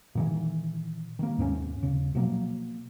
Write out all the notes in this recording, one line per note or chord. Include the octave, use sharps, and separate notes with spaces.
A#2 D#3 E3
D#3 A#3
D#2 G#2 C4 C#4
D#1 C#3
B2 F3 F#3 A#3